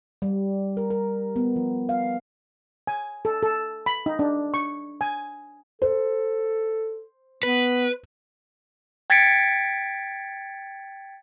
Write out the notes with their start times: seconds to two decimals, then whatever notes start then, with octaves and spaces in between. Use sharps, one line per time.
0.22 G3
0.77 A#4
0.90 A#4
1.36 B3
1.56 F3
1.89 F5
2.87 G#5
3.25 A4
3.43 A4
3.86 B5
4.06 D#4
4.19 D4
4.54 C#6
5.01 G#5
5.82 A4 C5
7.43 B3 B4
9.10 G5 G#6 A6 B6 C#7 D7